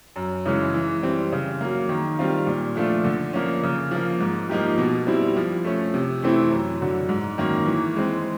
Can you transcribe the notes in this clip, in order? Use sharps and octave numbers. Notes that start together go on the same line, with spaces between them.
F#2
C#3 E3 G#3 C#4
E3
G3 C4
C#3
F#3 A#3
D#3
G3 C4 F4
A#2
F3 A3 D4 F4
D3
F3 A#3 C#4
C#3
F3 A#3
G#2
F3 A#3 D#4 G4
B2
G3 C4 E4
F3
A3 C#4
C3
E3 A3 C4 E4
F#2
D3 F#3
G#2
D#3 F#3 A#3 C#4
E3
G#3 C4